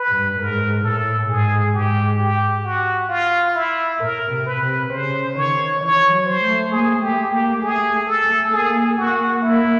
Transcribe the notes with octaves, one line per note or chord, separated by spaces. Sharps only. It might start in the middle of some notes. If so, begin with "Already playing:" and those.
Already playing: B4
G2
G#2 A#4
A2 A4
G#2 G#4
G#2 G4
G4
F#4
F4
E4
A2 A#4
C3
B4
C3
C#3 C5
D#3 C#5
E3 C#5
F#3
C5
A3
A#3 G#4
A3 G4
A#3 G4
A3 G#4
A4
A3
A#3 G#4
A#3 F#4
A#3 E4